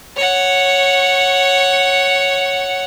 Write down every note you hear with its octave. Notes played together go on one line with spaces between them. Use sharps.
C#5 F#5